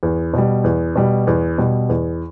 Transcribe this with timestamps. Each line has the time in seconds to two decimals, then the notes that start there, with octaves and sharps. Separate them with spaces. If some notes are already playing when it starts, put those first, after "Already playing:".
0.03 E2
0.34 B2 G3
0.64 E2
0.96 B2 G3
1.27 E2
1.58 B2 G3
1.89 E2